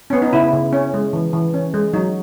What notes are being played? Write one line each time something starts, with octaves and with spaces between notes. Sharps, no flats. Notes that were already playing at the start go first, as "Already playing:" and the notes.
B3 C#4
D#4
C#3 E4
C#3
C#4
G#3
E3
E3
C#4
G#3
F#3 D#4